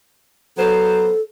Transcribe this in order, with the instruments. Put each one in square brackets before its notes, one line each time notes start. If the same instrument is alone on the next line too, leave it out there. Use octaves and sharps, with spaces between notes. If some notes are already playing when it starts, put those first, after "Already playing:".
[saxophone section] F#3 B3 C5 [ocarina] A4